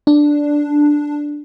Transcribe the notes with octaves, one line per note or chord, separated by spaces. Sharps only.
D4